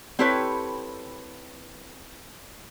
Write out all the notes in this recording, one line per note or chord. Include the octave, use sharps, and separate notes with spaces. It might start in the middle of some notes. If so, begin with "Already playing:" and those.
C4 E4 G4 A4 B4 C#5